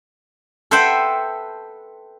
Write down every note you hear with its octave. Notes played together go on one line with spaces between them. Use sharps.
A4 B4 C5 E5 F#5 G5